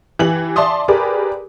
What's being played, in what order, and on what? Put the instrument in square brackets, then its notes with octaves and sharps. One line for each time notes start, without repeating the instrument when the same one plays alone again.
[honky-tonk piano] E3 G4 F#7
D5 E5 A5 C6 D#6
G4 G#4 A#4 B4 D5